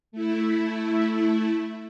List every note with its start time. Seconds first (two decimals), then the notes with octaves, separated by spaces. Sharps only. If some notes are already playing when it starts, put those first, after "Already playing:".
0.12 A3 E4